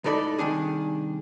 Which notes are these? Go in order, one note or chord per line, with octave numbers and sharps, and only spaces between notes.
C#2 A2 D#4 A4 D5 B5
C2 G#2 D#3 D4 G#4